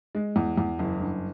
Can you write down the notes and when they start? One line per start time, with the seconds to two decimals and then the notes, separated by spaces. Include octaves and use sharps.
0.15 G#3
0.36 E2
0.57 E2
0.79 F#1
1.00 G2